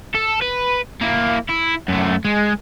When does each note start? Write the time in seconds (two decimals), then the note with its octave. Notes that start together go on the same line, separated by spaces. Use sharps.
0.15 A4
0.42 B4
1.01 A#3 E4
1.50 E4
1.89 F#2 A3
2.25 G#3